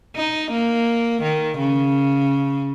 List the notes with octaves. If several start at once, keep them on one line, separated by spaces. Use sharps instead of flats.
D#4
A#3
D#3
C#3